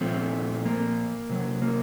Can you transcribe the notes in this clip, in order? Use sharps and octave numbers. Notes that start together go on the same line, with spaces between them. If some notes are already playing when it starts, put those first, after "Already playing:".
A#2 F3 A3 C4
A#3
C3 F#3
A#3